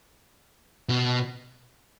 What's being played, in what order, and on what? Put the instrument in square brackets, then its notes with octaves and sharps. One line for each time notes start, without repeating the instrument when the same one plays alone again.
[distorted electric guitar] B2